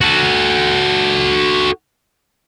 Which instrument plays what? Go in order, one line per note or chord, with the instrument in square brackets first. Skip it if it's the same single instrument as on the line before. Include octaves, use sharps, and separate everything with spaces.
[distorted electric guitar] F#4 A4